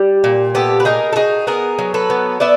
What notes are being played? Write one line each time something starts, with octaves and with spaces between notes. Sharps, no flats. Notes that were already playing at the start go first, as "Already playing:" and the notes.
Already playing: G3 G4
A#2
B3 G4 A4
B4
D#4 G#4 A#4
A4
D#4 F#4 G#4
B3 G#4 A#4
F#3
A4 B4
B3
B3 D5 E5